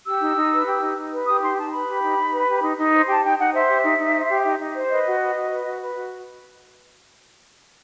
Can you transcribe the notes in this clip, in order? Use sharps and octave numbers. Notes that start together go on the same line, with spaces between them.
G4 E6
D#4
D#4
B4
G4
D#4
D#4
B4
G4 D#6
D#4 C6
D#4 A5
B4 B5
G4
D#4
D#4
B4
G4
D#4
D#4
C5
G4 A5
D#4 G5
D#4 F#5
C5 E5
G4
D#4
D#4
C5
G4
D#4
D#4
C5
B4 D#5
F#4
B4
F#4
B4
F#4
B4
F#4